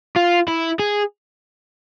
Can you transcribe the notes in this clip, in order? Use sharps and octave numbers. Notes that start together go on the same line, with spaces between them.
F4
E4
G#4